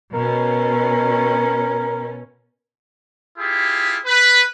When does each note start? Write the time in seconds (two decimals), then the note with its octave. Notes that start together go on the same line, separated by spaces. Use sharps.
0.14 B2 C#4 A#4
3.39 E4 F4 G4 G#4
4.06 B4